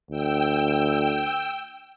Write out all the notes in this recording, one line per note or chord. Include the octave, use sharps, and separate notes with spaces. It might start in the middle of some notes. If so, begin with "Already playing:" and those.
D2 G5 E6